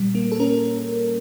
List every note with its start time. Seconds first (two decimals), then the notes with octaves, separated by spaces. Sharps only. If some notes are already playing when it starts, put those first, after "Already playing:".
Already playing: A#2 G3
0.15 A#3
0.32 A4
0.40 C#4 A#4